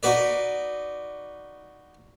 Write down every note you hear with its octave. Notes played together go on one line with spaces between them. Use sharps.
D#4 F#4 B4 D5